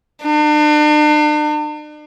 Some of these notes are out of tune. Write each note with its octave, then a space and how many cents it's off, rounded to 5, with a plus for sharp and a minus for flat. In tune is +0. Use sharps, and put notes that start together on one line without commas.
D4 +40